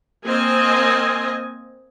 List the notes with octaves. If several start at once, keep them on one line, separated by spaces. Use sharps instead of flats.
A#3 C4 D#5 G#5